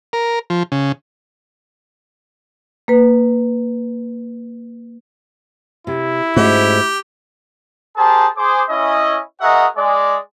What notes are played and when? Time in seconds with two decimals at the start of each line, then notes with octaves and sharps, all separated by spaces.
0.13 A#4
0.50 F3
0.72 C#3
2.88 A#3 B4
5.87 C3 E4
6.36 G#2 A3 C#4 F#4 G4
7.97 G4 G#4 A#4 C5 A5
8.37 G#4 C5 D6
8.69 C#4 E4 D#5
9.41 F#4 G#4 A#4 D#5 E5 F#5
9.77 G#3 D5